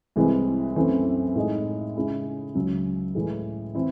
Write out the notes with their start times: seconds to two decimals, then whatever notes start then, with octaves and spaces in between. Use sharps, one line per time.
0.16 C2 C3 E3 G#3 C4
0.76 F#2 E3 A3 C4
1.35 A2 G#3 D#4
1.96 C#3 G#3 C#4 E4
2.55 C#2 C#3 F#3
3.15 A2 E3 G#3
3.75 E3 C4 E4